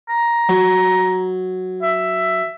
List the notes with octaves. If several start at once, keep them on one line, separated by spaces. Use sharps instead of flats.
A#5
F#3
E5